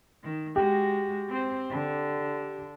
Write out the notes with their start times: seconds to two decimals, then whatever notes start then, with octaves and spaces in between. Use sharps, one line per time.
0.24 D#3
0.56 G#3 F#4 G4
1.29 C4 C5
1.70 D3